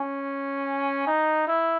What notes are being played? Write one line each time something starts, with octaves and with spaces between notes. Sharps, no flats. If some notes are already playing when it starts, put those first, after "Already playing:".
Already playing: C#4
D#4
E4